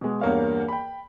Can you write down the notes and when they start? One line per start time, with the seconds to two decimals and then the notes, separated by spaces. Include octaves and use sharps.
0.01 B2 G#3
0.21 E2 G2 A#3 C#5 F5
0.68 G5 B5